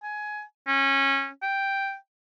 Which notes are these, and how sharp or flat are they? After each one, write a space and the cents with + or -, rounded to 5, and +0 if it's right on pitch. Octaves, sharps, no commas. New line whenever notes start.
G#5 +20
C#4 -20
G5 +0